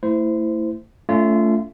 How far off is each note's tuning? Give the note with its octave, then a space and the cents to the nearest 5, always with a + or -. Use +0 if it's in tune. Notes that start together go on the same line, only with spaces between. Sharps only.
A3 +35 E4 +0 C5 -20
A3 +0 C#4 +25 F4 -25